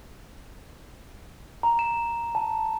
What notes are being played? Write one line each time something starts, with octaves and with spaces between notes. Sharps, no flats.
A#5
E7
A5